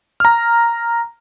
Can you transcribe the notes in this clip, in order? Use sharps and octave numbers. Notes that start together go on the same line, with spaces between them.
A#5 F6